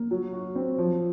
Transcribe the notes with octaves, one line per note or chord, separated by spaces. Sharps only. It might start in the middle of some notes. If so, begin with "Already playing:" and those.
Already playing: A#3
F#3
F#4
C4
F3